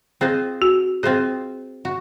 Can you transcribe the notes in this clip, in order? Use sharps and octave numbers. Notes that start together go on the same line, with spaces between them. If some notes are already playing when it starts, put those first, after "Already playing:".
C4 F4 G#4 C5 D#5
F#4
C4 F4 G#4 C5 D#5
F#4